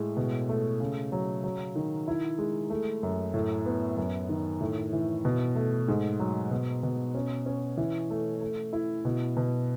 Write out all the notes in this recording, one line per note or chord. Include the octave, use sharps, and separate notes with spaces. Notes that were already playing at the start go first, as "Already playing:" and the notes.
Already playing: A2 G#3
B2
A3
C#3
F#3
F#3
D#3
E4
G#3
A3
F#2
A2
B3
F#2
D#3
A2
E3
B2
A3
G#2
F#3
B2
B2
C#4
C#4
E3
A3
A3
E4
B2
B2